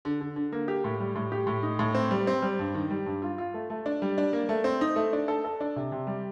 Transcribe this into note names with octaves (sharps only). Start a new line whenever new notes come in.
D3
D3
D3
A#3
G4
A2
G3
A2
G4
A2
D#4
A2
C4
G3
C4
G3
G2
D#3
G3
G2
F4
F4
A3
A3
D4
G3
D4
A#3
A3
C4
D#4
A3
D4
A4
A4
D4
C3
C3
G3